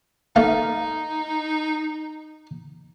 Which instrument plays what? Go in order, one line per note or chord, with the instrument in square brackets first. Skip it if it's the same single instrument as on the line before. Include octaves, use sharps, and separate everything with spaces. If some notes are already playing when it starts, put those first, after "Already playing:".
[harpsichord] A3 F5 [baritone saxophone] D#4